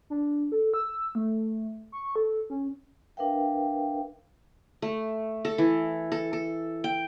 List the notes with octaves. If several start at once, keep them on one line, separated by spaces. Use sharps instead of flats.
D4
A4
E6
A3
C#6
A4
C#4
D4 A#4 B4 E5 F5 G5
A3
A4
E3
A4
A4
G5